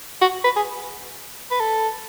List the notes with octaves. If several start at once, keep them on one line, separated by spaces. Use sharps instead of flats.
F#4
B4
G#4
B4
A4